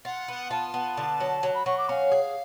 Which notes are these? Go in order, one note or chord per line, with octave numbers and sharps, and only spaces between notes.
F4 F#5
B3
F4 A5
B3
D3
F#3
F#3
B5
F#3 C#6
D6
C#4 F5
G#4